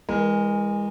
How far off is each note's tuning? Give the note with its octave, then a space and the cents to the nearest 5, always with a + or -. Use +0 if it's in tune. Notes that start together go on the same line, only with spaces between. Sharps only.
E3 +0 G#3 -25 A#4 +15